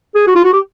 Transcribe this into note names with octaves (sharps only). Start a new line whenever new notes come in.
G#4
F#4
F4
F#4
G4